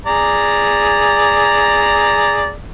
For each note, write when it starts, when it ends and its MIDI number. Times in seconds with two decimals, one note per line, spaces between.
0.06 2.51 68
0.06 2.51 74
0.06 2.51 82